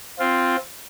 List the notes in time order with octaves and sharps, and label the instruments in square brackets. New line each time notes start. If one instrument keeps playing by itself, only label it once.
[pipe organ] C4 F4